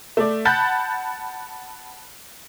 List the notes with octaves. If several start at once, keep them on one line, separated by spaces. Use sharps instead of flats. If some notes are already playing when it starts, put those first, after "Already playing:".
A3 D5
F#5 A5 B5 F#6 G6 A6